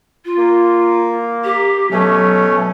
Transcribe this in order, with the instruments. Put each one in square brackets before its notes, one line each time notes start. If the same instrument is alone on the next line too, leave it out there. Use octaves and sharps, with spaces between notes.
[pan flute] F4
[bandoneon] A#3
[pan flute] G4
[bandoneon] B2 A3 C#4 [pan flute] F#3